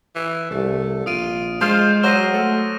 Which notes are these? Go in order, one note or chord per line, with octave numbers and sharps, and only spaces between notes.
E3
C2 A3
A#1 F4 D#6 D7 D#7
G#3 F4 C5 F5 D#6
F#3 C5 F6 A#6 D#7
A3 A4